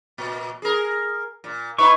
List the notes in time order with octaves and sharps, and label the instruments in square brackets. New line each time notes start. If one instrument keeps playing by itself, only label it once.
[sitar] A#2
G#4 A#4
A#2
[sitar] D#4 E4 B4 [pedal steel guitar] C#6